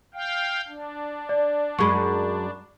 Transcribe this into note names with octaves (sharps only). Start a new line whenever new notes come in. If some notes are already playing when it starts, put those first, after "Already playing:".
F5 G5
D4
D5
F#2 G#3 B5 C#6